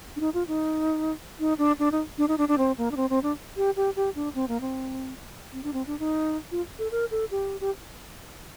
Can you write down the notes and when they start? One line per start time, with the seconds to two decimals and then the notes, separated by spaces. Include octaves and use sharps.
0.16 D4
0.20 D#4
0.34 F4
0.48 D#4
1.40 D#4
1.58 D4
1.79 D4
1.92 D#4
2.18 D4
2.28 D#4
2.38 D4
2.48 D4
2.58 C4
2.78 A#3
2.91 D4
2.97 C4
3.10 C4
3.23 D4
3.57 G4
3.76 G4
3.96 G4
4.15 D4
4.35 C4
4.48 A#3
4.61 C4
5.53 C4
5.64 D4
5.73 C4
5.87 D4
5.99 D#4
6.52 F4
6.79 A4
6.91 A#4
7.11 A4
7.31 G4
7.61 G4